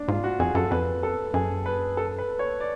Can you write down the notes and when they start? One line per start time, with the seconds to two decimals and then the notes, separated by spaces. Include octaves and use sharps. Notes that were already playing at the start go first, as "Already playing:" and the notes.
Already playing: D4
0.08 G#2 F4
0.24 F#4
0.39 F2 G#4
0.55 F#2 A4
0.71 F2 B4
1.03 A4
1.34 F#2 G#4
1.66 B4
1.97 A4
2.18 B4
2.39 C#5
2.60 D5